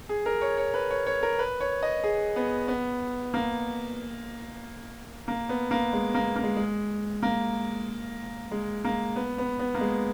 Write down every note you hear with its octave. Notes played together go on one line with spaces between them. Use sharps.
G#4
A#4
C#5
C#5
B4
C#5
C#5
A#4
B4
C#5
D#5
G#4
B3
B3
A#3
A#3
B3
A#3
G#3
A#3
A#3
G#3
G#3
A#3
G#3
A#3
B3
B3
B3
A#3
G#3